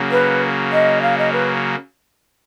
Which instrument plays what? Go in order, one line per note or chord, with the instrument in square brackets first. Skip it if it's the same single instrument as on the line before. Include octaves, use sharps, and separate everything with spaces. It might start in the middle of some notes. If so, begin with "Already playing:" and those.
Already playing: [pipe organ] C#3 F#3 A#3
[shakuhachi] B4
D#5
F5
D#5
B4